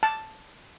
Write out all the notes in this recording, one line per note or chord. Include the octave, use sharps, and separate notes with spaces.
A5